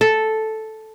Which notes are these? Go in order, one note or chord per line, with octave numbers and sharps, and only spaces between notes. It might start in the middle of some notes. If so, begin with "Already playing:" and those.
A4